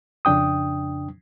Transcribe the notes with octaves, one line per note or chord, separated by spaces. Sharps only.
F2 C#3 D4 G5 D#6